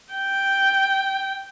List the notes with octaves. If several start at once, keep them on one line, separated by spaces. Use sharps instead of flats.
G5